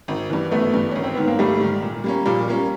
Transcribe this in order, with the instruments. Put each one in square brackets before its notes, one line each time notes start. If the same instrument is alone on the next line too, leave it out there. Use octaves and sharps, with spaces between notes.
[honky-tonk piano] G#1
G2 E3
[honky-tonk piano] G#1 [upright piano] A3 B3
[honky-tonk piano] G2 E3
[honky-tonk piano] G#1 [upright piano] C#4
[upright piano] C4
[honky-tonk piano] G#2 D#3 [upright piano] B3
[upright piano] A#3
[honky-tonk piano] G#1 [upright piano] G3 A3
[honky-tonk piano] G#2 D#3
A#2
G3 A#3 C#4
[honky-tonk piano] A#2 [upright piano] F3 G3
[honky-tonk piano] G3 A#3 C#4